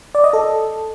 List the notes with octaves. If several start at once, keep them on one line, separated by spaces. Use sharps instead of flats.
D5
D#5
A4